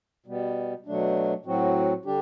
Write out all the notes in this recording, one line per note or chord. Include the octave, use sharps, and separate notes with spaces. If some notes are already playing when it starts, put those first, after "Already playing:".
B2 G3 B3
B2 F#3 A3 D4
A2 F#3 C4 F#4
D3 G3 D4 G4